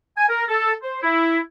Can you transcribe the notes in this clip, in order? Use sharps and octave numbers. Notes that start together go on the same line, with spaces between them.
G#5
A#4
A4
C5
E4